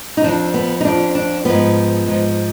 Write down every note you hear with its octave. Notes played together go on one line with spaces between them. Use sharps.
D#4
F2 F3 D4
B3
D#4
F2 F3 D4
D4
G#2 F3 B3
G#2 F3